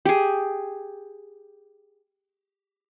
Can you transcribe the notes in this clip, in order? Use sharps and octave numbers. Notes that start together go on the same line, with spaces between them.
G4 G#4